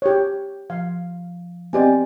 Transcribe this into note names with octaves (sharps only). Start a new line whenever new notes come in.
G4 C#5
F3 F5
B3 C4 G4 D5 D#5 G#5